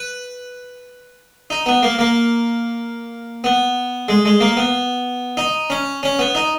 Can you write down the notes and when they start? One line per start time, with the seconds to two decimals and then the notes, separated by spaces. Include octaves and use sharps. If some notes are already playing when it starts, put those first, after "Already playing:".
Already playing: B4
1.50 D#4
1.66 B3
1.83 A#3
1.99 A#3
3.44 B3
4.08 G#3
4.25 G#3
4.40 A#3
4.57 B3
5.37 D#4
5.70 C#4
6.03 C#4
6.19 B3
6.35 D#4